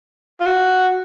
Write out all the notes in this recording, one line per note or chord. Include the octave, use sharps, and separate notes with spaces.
F4
F#4